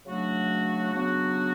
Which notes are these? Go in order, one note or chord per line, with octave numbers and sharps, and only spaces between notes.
C#3 F#3 A3 D4 F#4
C#3 F#3 B3 D4 F#4